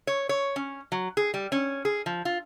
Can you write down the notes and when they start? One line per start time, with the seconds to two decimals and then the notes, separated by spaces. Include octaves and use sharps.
0.07 C#5
0.29 C#5
0.56 C#4
0.92 F#3
1.17 G#4
1.34 G3
1.52 C#4
1.85 G#4
2.06 F3
2.25 F4